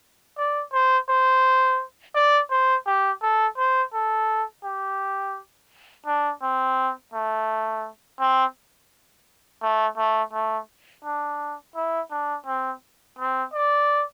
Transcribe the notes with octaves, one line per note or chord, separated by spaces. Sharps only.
D5
C5
C5
D5
C5
G4
A4
C5
A4
G4
D4
C4
A3
C4
A3
A3
A3
D4
E4
D4
C4
C4
D5